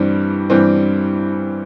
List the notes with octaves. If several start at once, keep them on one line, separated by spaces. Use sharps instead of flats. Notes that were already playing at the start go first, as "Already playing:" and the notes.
Already playing: G2 E3 G3 C4
G2 E3 G3 C4